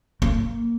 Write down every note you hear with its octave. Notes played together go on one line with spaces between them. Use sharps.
A#3